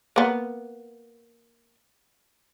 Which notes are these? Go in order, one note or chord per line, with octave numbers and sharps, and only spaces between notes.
A#3 B3